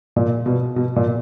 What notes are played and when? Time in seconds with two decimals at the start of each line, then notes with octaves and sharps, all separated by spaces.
0.16 A#2
0.46 B2
0.76 B2
0.96 A#2